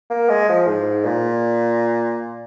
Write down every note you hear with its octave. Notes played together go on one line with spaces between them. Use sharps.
A#3
G#3
F3
G#2
A#2